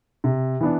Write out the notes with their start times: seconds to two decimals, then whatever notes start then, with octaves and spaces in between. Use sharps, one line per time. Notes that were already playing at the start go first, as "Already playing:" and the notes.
0.24 C3
0.60 E3 B3 D4